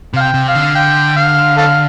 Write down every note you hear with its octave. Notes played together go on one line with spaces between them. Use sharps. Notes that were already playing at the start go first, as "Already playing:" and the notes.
C3 F5
G5
C3
F5
D3
G5
F5
A4 F5